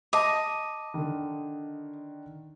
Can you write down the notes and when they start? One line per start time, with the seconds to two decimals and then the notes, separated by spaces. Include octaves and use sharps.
0.13 D#5 A5 D6
0.94 D3 D#3